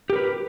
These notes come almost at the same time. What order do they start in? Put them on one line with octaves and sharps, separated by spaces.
G4 A#4 B4